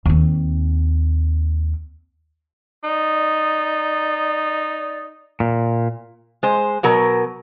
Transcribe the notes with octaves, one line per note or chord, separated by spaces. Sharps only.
D#2 C4
D#4 D5
A#2
G#3 C5
B2 F#3 A#4